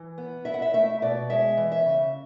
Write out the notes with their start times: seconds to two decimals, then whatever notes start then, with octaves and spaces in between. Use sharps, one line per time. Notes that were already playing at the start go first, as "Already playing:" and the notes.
Already playing: E3
0.18 B3
0.45 E4 E5
0.54 F#5
0.62 E5
0.73 A3 E5
1.02 B2 D5
1.30 G#3 E5
1.57 E3
1.72 E5
1.86 C#3